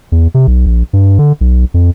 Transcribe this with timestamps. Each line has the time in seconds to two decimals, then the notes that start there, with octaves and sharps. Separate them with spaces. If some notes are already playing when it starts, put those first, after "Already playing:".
0.12 E2
0.34 C3
0.47 B1
0.66 A#1
0.93 G2
1.19 D3
1.41 B1
1.74 F2